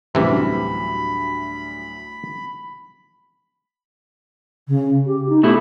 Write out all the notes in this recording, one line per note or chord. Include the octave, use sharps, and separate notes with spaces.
D2 A2 C3 E3 F#3 G3 B5
C#3
G4
D#4
B2 A3 E4 G4